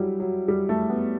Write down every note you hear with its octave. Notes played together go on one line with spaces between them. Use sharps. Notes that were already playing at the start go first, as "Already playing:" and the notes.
Already playing: F#3 G3 E4
F#3
G3
A3
B3